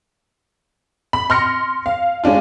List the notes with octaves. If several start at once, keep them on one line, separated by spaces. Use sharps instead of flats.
B5
C6 F6 A#6 C#7
F5
G#3 C#4 D4 F4